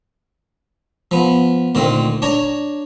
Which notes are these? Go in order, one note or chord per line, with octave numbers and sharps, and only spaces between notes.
F3 B3
D2 A#2 D#3 C4
D4 C#5 A#5